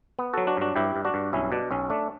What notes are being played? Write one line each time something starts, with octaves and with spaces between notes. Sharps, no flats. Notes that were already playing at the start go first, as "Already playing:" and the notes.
B3
F#3 F#4 A4
D4 F#4
G2 D4 F#4
G2 E4 G4
G2
D4 F#4
G2
B1 C#4 E4
B2 D4
B1 C#4
A3 D4